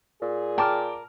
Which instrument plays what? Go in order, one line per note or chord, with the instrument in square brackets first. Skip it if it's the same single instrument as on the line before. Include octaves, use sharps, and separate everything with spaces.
[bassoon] A#2 [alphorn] G#4
[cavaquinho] A#4 A5 [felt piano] G5 D6 F6